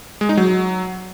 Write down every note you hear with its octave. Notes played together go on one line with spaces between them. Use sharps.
G#3
D#4
F#3